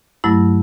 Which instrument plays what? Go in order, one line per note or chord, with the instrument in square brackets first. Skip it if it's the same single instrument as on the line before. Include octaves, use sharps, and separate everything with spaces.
[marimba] G2 F#3 A3 E4